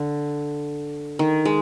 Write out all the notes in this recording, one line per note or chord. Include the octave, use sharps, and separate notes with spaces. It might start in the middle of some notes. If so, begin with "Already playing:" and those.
Already playing: D3
D#3
G#3